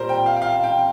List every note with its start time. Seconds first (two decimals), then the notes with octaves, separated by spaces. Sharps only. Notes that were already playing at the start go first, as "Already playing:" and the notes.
Already playing: A#2 G3 A#4 C5
0.09 G5
0.26 F5
0.36 G5
0.42 F5
0.64 G5